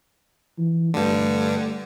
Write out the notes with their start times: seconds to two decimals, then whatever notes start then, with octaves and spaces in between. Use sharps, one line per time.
0.58 E3
0.94 G2 D3 A3